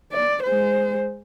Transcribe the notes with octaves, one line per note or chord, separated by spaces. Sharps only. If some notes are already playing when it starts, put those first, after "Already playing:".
D5
G#3 C5